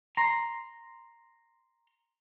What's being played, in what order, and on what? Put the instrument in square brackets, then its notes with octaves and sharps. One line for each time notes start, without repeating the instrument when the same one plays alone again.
[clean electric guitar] A#5 C6